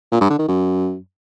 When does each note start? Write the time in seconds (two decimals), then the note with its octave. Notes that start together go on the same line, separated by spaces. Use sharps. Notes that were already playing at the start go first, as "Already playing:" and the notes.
0.12 A#2
0.21 G2
0.30 D3
0.39 D#3
0.48 F#2